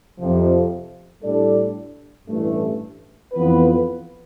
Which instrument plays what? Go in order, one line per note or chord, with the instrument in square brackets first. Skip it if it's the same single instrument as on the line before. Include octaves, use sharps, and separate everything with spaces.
[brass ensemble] F2 C3 F3
A2 G3 D4 A4 D5
A1 G2 E3 A3
F2 E3 B3 F4 B4